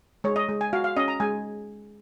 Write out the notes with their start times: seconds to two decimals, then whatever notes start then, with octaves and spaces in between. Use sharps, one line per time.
0.24 G#3 C#5
0.36 D#5
0.49 G#3
0.61 G#5
0.73 F#4 F5
0.84 F5
0.97 C#4 D#5
1.08 A#5
1.20 G#3 G#5